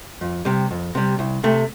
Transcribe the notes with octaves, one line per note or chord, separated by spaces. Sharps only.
F2
C3 G3
F2
C3 G3
C2
C3 A3